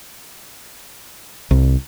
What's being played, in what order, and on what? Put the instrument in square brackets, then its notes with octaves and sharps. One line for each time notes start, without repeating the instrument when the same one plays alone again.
[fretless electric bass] C2